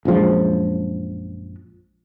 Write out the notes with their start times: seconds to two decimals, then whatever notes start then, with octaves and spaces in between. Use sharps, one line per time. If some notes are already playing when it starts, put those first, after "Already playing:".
0.05 A#1 F#2 F3 G#3